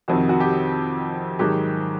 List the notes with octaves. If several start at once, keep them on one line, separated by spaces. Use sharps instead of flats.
F2 C3 D#3 F#4
F#4
G4
G#2 D#3 F#3 G4